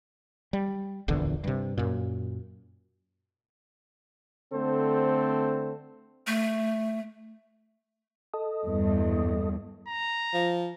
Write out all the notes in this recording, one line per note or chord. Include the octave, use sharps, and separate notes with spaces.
G3
D1 A#1 E2 D3
G2 C3
F#2 A#2
D3 A3 C4 A4 C5
A3
A4 D#5
E2 G2
A#5
F3